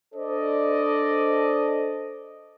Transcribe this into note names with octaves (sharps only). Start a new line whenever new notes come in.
D4 A4 C5 D5 D#5